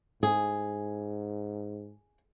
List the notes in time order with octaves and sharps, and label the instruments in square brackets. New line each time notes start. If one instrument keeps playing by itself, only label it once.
[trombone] G#2 [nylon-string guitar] G#4